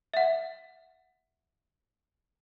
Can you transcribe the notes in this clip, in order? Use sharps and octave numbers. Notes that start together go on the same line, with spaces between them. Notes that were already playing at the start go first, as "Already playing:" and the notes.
E5 F#5